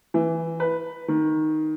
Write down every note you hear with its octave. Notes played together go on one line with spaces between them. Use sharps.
E3
B4
D#3